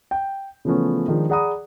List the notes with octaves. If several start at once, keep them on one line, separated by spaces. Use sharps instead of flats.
G5
C#3 E3 F3 A3 B3 C#4
D#3 F3 G#3 D4
G#4 D5 F#5 A#5 B5 D#6